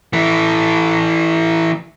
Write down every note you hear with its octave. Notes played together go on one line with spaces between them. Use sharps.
E3 A3